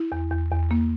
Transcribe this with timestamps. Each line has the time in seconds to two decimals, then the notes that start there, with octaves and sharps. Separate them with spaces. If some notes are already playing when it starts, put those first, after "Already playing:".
Already playing: E4
0.12 E2
0.31 E2
0.51 E2
0.71 A#3